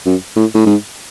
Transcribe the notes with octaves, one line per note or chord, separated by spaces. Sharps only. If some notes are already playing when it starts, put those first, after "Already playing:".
F#2
A2
A2
G#2